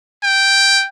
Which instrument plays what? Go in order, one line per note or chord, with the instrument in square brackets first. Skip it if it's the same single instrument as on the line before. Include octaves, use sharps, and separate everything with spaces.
[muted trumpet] G5